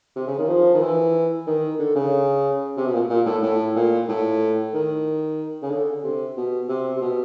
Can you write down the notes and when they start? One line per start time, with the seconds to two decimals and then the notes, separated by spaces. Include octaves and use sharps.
0.15 C3
0.27 C#3
0.38 D#3
0.48 F3
0.74 D#3
0.81 E3
1.47 D#3
1.79 D3
1.95 C#3
2.77 C3
2.86 B2
2.93 A#2
3.09 A#2
3.26 A2
3.43 A2
3.76 A#2
4.08 A2
4.73 D#3
5.62 C#3
5.71 D3
6.03 C3
6.37 B2
6.69 C3
6.96 C3
7.01 B2